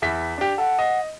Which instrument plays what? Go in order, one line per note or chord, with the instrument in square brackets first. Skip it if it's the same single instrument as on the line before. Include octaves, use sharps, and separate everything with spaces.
[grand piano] E2 E4 B6
D4 G4
[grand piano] A4 [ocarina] F#5
[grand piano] D#5